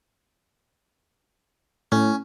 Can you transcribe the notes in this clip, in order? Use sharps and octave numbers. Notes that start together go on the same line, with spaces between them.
A2 C#4